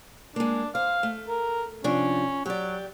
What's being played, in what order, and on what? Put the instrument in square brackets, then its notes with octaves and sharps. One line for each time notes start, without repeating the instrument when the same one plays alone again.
[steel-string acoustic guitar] G#3 A#3 [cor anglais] D4
[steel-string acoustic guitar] C5 [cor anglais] F5
[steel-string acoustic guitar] A3
[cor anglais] A#4
[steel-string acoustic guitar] C3 F3 D4 [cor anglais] C#4
[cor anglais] F#3 [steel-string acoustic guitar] G4 D5